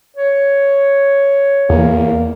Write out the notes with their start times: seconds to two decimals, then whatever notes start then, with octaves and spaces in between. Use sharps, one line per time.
0.16 C#5
1.70 E2 A#3